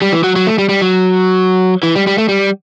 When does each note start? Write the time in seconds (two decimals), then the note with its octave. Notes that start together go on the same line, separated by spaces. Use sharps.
0.02 G3
0.12 E3
0.23 F#3
0.36 F#3
0.47 A3
0.58 G3
0.69 G3
0.81 F#3
1.83 E3
1.95 G3
2.07 G3
2.18 A3
2.29 G3